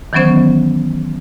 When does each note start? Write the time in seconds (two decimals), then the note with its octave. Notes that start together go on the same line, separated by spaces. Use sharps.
0.13 D#3 E3 F#3 B3 C#4 C5